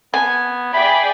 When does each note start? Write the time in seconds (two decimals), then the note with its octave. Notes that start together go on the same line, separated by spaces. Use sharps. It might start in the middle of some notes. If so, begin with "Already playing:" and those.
0.14 B3 G#5
0.73 G#4 D5 E5 G5 B5